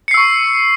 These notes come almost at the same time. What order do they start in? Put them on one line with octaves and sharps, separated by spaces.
C#7 C7 E6 C#6